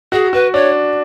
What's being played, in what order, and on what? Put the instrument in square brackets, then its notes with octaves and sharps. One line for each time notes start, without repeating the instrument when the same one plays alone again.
[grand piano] F#4 [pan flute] G#4
[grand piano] F#4 [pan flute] B4
[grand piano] D4 [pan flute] C#5